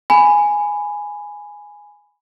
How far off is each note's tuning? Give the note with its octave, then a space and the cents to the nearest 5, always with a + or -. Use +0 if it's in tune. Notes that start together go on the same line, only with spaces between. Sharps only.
G#5 +0 B5 +10